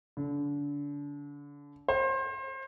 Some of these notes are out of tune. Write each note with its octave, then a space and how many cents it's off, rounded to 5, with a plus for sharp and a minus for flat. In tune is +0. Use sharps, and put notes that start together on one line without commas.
D3 -30
C5 +30